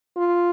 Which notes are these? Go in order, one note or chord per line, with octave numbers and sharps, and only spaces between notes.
F4